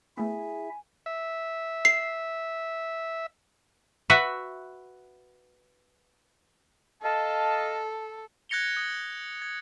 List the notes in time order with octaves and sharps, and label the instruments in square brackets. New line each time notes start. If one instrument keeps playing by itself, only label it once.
[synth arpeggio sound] A3 B3 [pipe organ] E4 E5 [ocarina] G#4 [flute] G#5
[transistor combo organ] E5
[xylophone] C7
[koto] F#4 B4 E5 F#5
[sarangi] A4 [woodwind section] D#5 F5 A5
[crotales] F#6 G#6 A#6 C#7 F7 G7
D#6
G#6